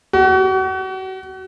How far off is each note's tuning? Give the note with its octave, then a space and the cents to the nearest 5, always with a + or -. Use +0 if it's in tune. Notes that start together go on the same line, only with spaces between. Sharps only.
F#4 +35